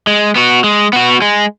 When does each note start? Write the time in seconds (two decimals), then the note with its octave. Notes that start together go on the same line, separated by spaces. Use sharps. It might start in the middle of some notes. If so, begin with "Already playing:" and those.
0.07 G#3
0.36 B3 F#4
0.64 G#3
0.93 B3 F#4
1.22 G#3